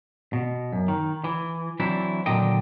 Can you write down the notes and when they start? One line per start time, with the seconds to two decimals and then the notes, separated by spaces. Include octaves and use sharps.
0.33 B2
0.73 F#2
0.88 D#3
1.24 E3
1.80 E3 F#3 C4 D4 E4
2.26 D#2 A#2 D3 F#3 D#5 G5